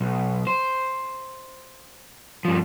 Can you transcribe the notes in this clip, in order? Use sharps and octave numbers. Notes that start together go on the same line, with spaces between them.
B1
C5
G2 F3